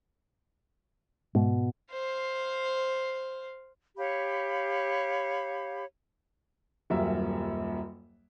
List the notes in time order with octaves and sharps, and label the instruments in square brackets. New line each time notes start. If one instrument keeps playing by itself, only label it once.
[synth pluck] G#2 [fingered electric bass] B2
[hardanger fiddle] C5 F5
[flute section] G4 C#5 F5 B5
[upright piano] D#1 F#2 G3 A#3 E5